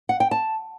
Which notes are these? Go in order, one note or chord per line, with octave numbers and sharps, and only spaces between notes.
F#5
G5
A5